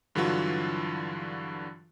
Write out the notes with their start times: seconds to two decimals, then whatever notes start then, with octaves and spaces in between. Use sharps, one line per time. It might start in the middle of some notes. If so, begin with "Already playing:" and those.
0.15 G2 D3 E3 F#3 F4 F#4